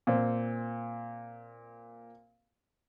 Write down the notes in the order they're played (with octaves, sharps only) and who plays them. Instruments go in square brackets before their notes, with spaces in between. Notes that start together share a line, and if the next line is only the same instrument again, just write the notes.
[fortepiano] A#2 C4